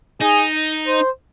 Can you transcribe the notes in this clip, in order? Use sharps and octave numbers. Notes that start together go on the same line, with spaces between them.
D#4 G#4
C5